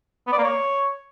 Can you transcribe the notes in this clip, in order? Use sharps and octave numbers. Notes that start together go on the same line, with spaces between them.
B3
D5
A#3
C#5